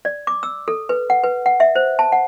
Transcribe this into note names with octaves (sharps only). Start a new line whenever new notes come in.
D5
D6
E6
A4
B4
F#5
B4
F#5
E5
C5
A5
F#5